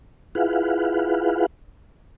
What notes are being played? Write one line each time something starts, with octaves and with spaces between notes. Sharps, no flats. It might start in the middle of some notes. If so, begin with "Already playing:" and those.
E4 F4 G#4 B4 F5 F#5